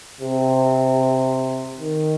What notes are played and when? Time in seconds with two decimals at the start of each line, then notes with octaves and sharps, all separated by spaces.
0.21 C3
1.79 D#3